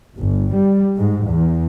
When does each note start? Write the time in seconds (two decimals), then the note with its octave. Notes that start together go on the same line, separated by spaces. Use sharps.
0.17 G1
0.54 G3
0.96 G#2
1.27 E2